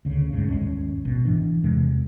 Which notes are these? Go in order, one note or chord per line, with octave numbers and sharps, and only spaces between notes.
D2 C#3
D#1 G#2 C#3
G#1 D#2 G#3 C#4
G#1 B2
E3 D4
E2 C3 G#3